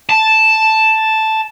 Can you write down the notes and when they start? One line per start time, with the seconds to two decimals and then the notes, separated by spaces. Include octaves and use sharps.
0.09 A5